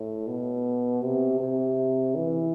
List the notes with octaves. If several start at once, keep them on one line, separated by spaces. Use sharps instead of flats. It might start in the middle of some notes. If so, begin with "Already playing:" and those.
Already playing: A2
B2
C3
C3
E3